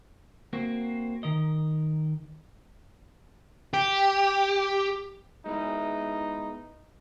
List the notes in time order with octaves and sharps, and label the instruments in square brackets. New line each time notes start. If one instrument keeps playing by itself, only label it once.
[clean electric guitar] A#3 C4 F#4
D#3 A#4 D#5
[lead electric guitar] G4
[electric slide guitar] G#3 B3 E4 [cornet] D#4